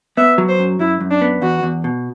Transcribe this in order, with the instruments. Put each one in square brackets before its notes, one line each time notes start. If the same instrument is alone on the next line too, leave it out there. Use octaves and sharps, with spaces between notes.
[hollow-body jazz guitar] B3 [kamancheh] E5
[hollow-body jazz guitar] F#3
[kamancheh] C5
[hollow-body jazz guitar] F#2
[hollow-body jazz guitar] F#2 [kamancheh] E4
[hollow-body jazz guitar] F#2
[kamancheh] D4
[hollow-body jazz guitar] B3
[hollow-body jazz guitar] E2 [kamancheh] F#4
[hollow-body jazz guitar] E2
B2